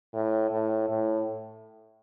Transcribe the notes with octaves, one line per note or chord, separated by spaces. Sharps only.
A2
A2
A2